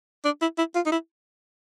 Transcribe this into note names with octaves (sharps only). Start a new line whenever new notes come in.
D4
E4
E4
F4
D#4
E4